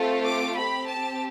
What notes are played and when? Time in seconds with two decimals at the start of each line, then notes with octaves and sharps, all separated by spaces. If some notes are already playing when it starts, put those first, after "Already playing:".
Already playing: A3 C4 F4 A4
0.23 D6
0.55 C4 G4 B5
0.86 A5